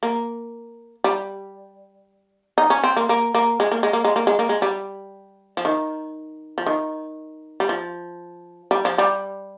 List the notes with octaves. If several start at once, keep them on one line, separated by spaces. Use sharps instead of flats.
A#3
G3
D#4
C#4
C4
A#3
A#3
A#3
G#3
A#3
G#3
A#3
G#3
A#3
G#3
A#3
G#3
G3
F3
D#3
F3
D#3
G3
F3
G3
F3
G3